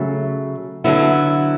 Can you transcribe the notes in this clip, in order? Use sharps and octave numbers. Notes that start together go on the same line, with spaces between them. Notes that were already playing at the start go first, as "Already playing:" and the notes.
Already playing: C#3 F#3 A3
D3 F#3 B3 E4